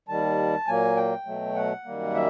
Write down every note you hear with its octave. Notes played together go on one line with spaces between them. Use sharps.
D#2 D#3 G3 A5
A#2 F#3 A#3 G#5
G5
B2 F#3 A3
F#5
F#2 D#3 G3 A#3
E5